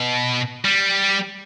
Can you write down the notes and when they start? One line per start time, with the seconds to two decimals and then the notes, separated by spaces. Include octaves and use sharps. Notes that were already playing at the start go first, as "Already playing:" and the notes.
Already playing: B2
0.65 G3